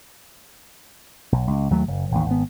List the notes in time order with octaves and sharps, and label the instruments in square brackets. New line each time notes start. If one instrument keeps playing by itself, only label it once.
[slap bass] B1
C#2
D#2 F#3 A3
F#1
A1 D#2
G#1 B3